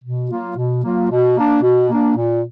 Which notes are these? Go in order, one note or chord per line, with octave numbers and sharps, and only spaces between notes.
B2
F#3 A#3 F4
B2
F#3 A#3 F4
B2
A#3 D4
B2
A#3 D4
A#2